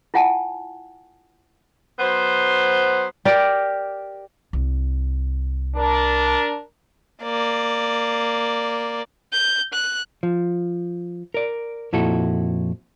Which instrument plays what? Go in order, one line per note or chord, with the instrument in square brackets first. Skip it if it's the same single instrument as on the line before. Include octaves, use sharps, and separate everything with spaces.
[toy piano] E4 F4 F#5 G#5 A5
[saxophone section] F#3 B3 C5
[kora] G4 A#4 D5
[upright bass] C2
[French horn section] D4 A#4
[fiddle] A#3 D5
[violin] G6
F#6
[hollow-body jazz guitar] F3
A#4 D5
F2 A#2 E4 F#4 A4